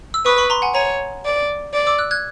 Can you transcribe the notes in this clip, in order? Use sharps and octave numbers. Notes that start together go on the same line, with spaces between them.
E6
B4 C#6 D#6
B5 C#6
A#5 C6
F#5 G#5
C#5 G#5 A#5
D5
D5
D6 E6
E6 F#6
F#6 G#6